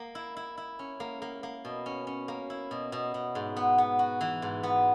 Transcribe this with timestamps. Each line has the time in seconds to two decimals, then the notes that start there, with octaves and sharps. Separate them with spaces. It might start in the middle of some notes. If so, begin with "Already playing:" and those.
Already playing: A#3
0.15 E4
0.36 E4
0.57 E4
0.79 C#4
1.00 A#3
1.22 A#3
1.43 A#3
1.65 B2
1.86 C#4
2.07 C#4
2.28 A#3
2.50 E4
2.71 B2
2.92 B2
3.14 B2
3.35 G#2
3.56 B3
3.78 B3
3.99 F#4
4.21 E3
4.42 G#2
4.63 B3